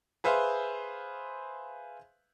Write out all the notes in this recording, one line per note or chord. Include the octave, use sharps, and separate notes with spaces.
G#4 B4 C5 E5 F5